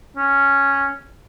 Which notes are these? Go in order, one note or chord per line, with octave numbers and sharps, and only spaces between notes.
C#4